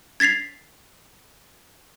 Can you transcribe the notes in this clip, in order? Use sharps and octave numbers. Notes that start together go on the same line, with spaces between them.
G#6 A6 B6 C7 F7